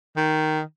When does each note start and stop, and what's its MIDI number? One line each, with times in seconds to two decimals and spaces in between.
0.17 0.61 51